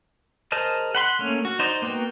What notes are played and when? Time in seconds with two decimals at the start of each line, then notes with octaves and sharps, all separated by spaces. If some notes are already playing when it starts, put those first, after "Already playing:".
0.52 G#4 A#4 C5 D#5 A5
0.95 F#5 B5 C6
1.19 A3 A#3 C#4
1.45 F#4
1.59 D#4 C5 D5 D#5
1.82 A#3 B3 F#4 G5